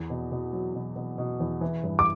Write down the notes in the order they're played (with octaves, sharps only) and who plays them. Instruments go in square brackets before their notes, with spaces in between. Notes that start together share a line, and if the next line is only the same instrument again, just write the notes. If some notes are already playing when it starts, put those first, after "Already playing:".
Already playing: [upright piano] E2
B2
B2
F#3
B2
B2
B2
E2
E3
G2
[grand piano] D6